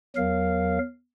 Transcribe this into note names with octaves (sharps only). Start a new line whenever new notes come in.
E2 F#3 A#4 F5